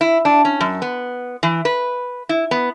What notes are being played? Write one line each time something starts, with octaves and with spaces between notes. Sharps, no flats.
E4
D4
C#4
F#2
B3
E3
B4
E4
B3